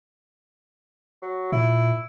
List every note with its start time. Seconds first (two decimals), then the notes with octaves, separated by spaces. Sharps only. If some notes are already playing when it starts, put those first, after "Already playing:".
1.22 F#3
1.52 A#2 E4